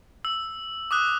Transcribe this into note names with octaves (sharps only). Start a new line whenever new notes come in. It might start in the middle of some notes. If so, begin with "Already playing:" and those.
E6
D6 D#6 F#6